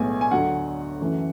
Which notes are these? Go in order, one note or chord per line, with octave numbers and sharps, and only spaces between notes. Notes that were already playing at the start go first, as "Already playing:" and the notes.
Already playing: B1 A2 G#3 B3 G#5
G#5
D2 D3 F#3 F#5
F#2 E3 A3